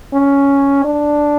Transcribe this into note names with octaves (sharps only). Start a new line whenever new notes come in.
C#4
D4